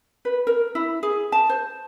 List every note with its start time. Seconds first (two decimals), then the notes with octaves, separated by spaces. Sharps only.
0.25 B4
0.47 A#4
0.75 E4
1.03 G#4
1.32 A5
1.49 C5